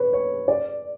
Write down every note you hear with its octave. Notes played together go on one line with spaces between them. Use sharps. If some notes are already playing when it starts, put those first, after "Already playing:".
Already playing: B4 C#5
C#5
D5